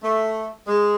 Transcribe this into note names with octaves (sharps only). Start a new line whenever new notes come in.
A3
G#3